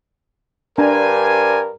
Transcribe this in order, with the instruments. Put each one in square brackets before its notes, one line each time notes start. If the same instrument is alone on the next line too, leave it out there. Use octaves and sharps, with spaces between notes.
[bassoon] G2 [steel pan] D4 A#5 [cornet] A#4 [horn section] C5 D5 G#5